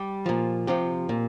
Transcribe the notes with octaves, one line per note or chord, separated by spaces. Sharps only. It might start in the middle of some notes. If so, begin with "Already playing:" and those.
Already playing: G3 G4
A#2 F3
C3 F3 G4
A#2